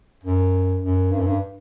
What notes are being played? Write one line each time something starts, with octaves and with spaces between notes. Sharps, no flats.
F#2
F#2
G2
F#2
G2